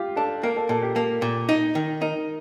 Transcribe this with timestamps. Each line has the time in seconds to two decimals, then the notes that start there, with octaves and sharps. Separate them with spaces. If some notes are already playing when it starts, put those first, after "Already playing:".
Already playing: F4 G4
0.16 D4 A4
0.43 A#3 A#4
0.56 A4
0.69 A#2 A4
0.82 G4
0.95 A#3 A4
1.22 A#2
1.49 D#4
1.75 D#3
2.01 D#4 A#4